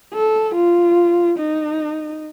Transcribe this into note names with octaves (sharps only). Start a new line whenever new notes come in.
A4
F4
D#4